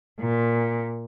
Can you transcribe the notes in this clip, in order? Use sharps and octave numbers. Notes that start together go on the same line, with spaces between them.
A#2